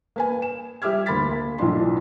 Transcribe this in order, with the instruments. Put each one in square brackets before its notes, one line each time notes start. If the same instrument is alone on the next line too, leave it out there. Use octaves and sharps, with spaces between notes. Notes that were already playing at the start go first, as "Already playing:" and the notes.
[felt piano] A#3 B4 G#5
E7
G3 G4 E5 D6 F6 G#6
D2 A#3 B5 C6 A6 B6
A#3
B1 A2 E3 F3 D4 C6